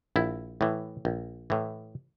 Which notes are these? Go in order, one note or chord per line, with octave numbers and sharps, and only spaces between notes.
A#1 E4
A2 E3
A#1
A2 E3